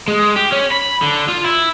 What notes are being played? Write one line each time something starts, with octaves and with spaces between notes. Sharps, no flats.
G#3
G4
C#4
B5
D3
F4
E4